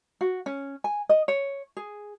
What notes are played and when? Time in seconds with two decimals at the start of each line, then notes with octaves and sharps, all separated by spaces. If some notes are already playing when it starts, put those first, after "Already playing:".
0.21 F#4
0.46 C#4
0.84 G#5
1.09 D#5
1.28 C#5
1.77 G#4